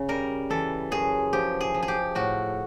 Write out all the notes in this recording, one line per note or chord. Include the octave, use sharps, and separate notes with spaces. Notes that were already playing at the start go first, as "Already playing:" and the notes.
Already playing: C#3
G3 A#4
E3 A4
F#2 G#4
F3 G4
G#4
F3
G#4
G4
A2 F#4